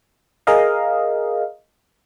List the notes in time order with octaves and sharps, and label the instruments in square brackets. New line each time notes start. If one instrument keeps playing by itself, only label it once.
[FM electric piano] G#4 A#4 D#5 F5